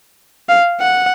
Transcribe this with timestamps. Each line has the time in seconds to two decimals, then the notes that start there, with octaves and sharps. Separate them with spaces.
0.49 F5
0.80 F#5